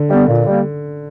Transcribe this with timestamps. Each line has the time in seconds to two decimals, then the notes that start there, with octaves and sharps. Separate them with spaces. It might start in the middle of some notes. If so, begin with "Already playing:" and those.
Already playing: D3
0.09 G3 B3
0.27 A#2
0.46 G3 A#3